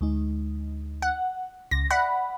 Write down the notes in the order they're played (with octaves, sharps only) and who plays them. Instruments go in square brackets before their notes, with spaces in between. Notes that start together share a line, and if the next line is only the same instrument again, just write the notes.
[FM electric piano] D2 G#3 D#4
[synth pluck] F#5
[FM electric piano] C#2 [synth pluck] A#6
[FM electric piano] D5 E5 [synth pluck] F#5 B5